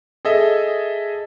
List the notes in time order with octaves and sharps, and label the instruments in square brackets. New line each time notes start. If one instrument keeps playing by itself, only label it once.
[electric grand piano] G#4 A4 D#5 E5